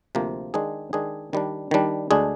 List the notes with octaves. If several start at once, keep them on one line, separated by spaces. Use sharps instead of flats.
D2 C3 F3 A#3
D#3 G#3 D4 G#4
D#3 G#3 D4 G#4
D#3 G3 D4
D#3 G3 D4
D2 D3 G#3 D4 G#4